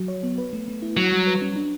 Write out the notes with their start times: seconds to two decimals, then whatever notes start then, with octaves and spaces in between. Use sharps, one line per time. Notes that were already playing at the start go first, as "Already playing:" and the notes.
Already playing: F#3 F#4
0.08 C#5
0.23 B3
0.38 B4
0.53 A3
0.68 A3
0.82 E4
0.97 F#3 F#4
1.12 G3
1.27 B4
1.42 C#4
1.56 D4